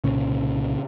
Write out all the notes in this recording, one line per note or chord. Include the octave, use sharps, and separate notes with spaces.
C2 A#2 C#3 C#4